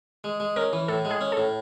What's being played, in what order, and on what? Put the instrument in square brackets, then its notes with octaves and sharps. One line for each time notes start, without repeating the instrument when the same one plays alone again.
[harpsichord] G#3
G#3
[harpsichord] C#4 [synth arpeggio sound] A#4
[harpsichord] E3
[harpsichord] A2 [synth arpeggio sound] A4
[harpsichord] G#3
[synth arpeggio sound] G#4
[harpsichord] C#4
[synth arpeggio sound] A4
[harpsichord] A2